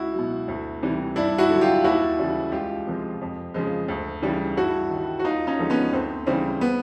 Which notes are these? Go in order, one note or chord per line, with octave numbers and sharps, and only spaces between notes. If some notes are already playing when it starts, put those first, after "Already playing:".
Already playing: C#2 E4 F#4
B2 F#3
D2
C3 E3 G3
G2 D4 E4
E4 F#4
D3 F#3
F4 G4
D#2 E4 F#4
C#3 E3 G3
C#2 F4 G4
C3 F3 G#3
F2
C#3 F3 G#3
D2
C#3 E3 G3
G2 E4 F#4
D#3
G3
F#4
D#2 D#4 F4
C#4 D#4
D3 F3 G#3
B3 C#4
D2 C4
C#3 E3 G3 C4
B3